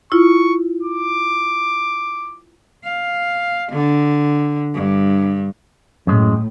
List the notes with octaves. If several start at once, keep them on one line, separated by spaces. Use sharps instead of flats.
E4 F4 C#6
D6
F5
D3
G2
F#2 A2 G#3